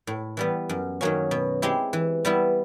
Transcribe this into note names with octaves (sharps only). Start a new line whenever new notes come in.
A2
E3 G3 B3
F#2
D#3 F#3 A#3 C#4
B2
G#3 C4 E4 G4
E3
G3 B3 E4